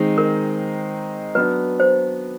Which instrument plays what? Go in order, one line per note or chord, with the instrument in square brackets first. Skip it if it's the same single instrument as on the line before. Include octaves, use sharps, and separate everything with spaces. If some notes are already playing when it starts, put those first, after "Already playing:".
Already playing: [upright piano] D#3 G#3 C4 D#4
[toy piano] A#4
[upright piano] F#3 B3 D4 [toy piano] B4
[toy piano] C5